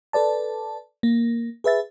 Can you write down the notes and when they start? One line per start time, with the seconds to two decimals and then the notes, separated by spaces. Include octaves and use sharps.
0.13 A4 B4 D5 A5
1.03 A#3
1.64 G#4 B4 E5 A6